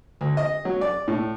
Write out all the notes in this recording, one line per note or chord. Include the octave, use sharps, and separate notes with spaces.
D2
D#5
F#3
D5
A2